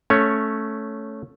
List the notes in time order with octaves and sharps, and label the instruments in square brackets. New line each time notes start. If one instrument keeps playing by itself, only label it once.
[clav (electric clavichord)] A3 C#4 C#5